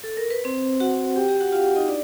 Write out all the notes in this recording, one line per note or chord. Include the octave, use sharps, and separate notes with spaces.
A4
A#4
B4
C4 C5
F#4 F#5
G4 G5
G4 G5
F#4 F#5
F4 F5
D#4 D#5
D4 D5